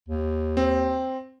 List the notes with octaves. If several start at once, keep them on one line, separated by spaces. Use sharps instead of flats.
D#2
C4